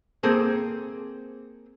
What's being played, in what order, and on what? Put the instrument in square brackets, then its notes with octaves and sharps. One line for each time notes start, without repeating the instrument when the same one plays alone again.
[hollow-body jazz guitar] A#3 C4 G#4 A4 C5